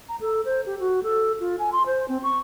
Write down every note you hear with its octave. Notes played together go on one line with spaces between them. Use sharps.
A#5
A4
C5
G4
F#4
A4
F4
G#5
C6
C5
C4
C#6